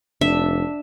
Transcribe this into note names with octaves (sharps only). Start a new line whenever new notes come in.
F1 D4 E5